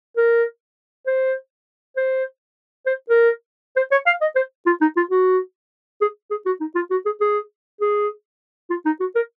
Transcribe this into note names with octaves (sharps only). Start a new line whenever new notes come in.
A#4
C5
C5
C5
A#4
C5
C#5
F5
D#5
C5
F4
D#4
F4
F#4
G#4
G#4
F#4
D#4
F4
F#4
G#4
G#4
G#4
F4
D#4
F#4
A#4